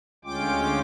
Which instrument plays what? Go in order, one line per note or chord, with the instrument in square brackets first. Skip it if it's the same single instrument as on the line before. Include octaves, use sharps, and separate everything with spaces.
[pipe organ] D2 G#3 C#4 F4 G5 D6